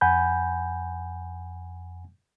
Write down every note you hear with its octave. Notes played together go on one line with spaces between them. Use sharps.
F2 F#5 G#5 B5 G6